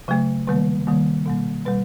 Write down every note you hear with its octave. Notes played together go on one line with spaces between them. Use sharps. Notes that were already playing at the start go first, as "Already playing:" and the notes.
C#3 F#3 A3
C3 D#3 G3 A#3 B4
C3 D#3 G3 A#3
B2 G3 A#3
B2 G3 B4